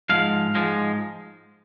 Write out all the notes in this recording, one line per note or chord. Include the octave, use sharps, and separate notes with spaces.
G#2 F3 G#3 F5
G#2 F3 G#3